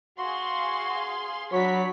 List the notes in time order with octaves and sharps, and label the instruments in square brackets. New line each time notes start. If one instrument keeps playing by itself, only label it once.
[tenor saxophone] F#4 [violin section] G#4 F5 C6
[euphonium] F#3 [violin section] D4 B5 B6 [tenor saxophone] C#5